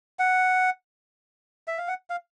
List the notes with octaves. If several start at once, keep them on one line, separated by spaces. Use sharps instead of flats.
F#5
E5
F5
F#5
F5